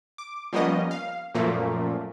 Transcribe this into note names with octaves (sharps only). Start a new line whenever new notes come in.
D6
F3 G3 A#3 B3 C#4 D#5
F5
F#2 A#2 F3 A3 A#3